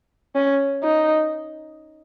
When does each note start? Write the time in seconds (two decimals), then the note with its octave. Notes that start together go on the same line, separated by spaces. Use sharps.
0.35 C#4
0.83 D#4